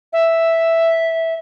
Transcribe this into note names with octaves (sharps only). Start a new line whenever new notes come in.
E5